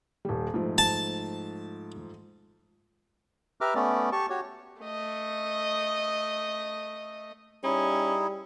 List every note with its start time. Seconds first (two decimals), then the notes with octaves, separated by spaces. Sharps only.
0.25 D#1 G3
0.54 G#2 F3 A3
0.78 A5
3.61 G4 B4 E5 A#5 D6 F6
3.75 A3 B3 C#4 D5
4.12 G4 A5 C#6
4.30 F#4 G4 C#5
4.82 A3 D#5
7.64 G3 C#4 D#4 E4 G#4